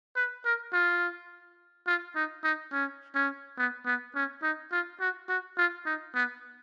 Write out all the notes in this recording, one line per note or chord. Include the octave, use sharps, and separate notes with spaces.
B4
A#4
F4
F4
D#4
D#4
C#4
C#4
B3
B3
C#4
D#4
F4
F#4
F#4
F4
D#4
B3